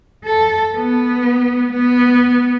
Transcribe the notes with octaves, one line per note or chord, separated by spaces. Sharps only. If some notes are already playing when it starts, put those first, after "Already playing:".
A4
B3
B3